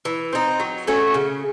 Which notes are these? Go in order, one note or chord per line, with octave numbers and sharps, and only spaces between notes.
E3
C4 D#4
F#3
A3 C#4 F#4
C#3